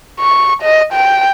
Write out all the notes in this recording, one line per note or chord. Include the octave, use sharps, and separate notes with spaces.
C#6
D#5
G5